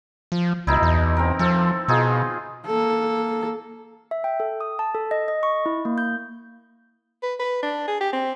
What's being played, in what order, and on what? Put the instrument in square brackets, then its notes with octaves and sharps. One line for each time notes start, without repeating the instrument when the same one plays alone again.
[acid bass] F3
[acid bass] C#2 [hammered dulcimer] B2 D#4 E4
[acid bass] E2
[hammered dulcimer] C4 A#4
[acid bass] F3 [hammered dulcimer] C4 A4
[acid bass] B2 [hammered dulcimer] D#4 F4 G#4
[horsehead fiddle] A#3 A4
[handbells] E5
G5
A4
D#6
A5
A4
D#5
D#5
C#6
E4
A#3
G6
[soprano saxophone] B4
B4
D4
G#4
G4
C4